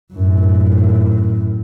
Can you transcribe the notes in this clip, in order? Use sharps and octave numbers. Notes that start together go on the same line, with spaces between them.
F#2 A2